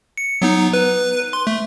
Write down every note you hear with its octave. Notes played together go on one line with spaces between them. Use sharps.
C#7
F#3 B3 D#4
B4
C6
A3